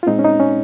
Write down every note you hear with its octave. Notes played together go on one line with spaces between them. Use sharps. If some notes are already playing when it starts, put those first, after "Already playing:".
F4
A#2 G#3 C4 D#4
C#4
D#4
C#4